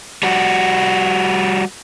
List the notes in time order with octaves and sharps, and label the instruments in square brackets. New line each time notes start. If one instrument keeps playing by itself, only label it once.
[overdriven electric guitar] G3 F#4